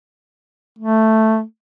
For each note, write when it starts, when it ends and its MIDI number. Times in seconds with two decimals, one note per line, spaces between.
0.79 1.42 57